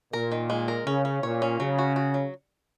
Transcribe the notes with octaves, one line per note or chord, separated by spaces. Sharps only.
A#2 A#4
D#3
G#3
A#4
C#3 C#4
C#4
A#2 C#5
C#4
C#3 F#3
F#4
F#4
F#3